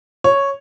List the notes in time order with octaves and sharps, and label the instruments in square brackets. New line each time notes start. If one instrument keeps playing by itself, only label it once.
[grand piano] C#5